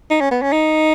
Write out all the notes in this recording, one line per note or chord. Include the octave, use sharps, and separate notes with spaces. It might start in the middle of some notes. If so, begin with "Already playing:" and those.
D#4
C#4
B3
C#4
D#4